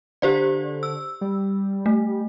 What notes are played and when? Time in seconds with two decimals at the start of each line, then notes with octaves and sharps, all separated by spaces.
0.22 D3 G4 C5 D5
0.83 E6
1.21 G3
1.86 A3